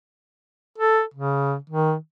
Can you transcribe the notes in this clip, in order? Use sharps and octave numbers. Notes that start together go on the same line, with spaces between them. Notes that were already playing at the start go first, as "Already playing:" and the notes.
A4
C#3
D#3